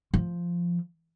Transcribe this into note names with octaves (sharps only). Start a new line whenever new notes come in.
F3